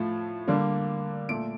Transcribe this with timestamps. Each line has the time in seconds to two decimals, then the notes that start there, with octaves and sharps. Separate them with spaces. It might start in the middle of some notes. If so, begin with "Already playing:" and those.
Already playing: A2 F3 A3
0.48 D3 G3 A#3
1.29 A#2 A3 D7